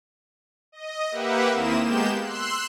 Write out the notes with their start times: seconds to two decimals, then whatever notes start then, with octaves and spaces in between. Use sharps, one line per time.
0.72 D#5
1.11 A#3 G4 B4 E5 F#5
1.53 D#2 A#3 C4 E4 D#6 E7
1.84 G#3 A#3 B3 G4 G6 E7
2.21 C6 E6 F#6